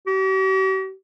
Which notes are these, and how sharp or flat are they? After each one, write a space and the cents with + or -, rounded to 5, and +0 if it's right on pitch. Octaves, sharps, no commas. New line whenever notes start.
G4 -45